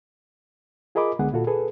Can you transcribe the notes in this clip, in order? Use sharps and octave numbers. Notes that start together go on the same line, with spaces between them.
F4 G#4 A#4 D#5 B5 D6
C#2 D3 G#3 B3 G#4 F#5
A#2 F4 F#4 A4
G#4 A4 B4